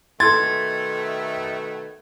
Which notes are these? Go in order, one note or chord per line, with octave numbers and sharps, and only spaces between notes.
B2 D#3 A3 A4 C6 G#6 A6